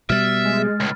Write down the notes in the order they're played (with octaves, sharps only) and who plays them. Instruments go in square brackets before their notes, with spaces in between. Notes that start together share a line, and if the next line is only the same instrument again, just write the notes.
[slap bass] B2 G3 [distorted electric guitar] E5 [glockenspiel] F6 A6
[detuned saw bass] G#3
[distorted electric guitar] C#2 A2